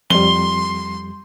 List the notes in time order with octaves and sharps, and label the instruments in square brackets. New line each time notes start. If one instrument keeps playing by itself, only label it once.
[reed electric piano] F2 G3 [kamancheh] C6 [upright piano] G7